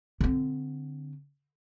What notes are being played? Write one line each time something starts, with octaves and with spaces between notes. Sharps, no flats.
D3 C4